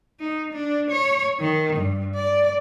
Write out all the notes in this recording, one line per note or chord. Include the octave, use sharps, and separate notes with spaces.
D#4
D4
C#5
D#3
G2
D5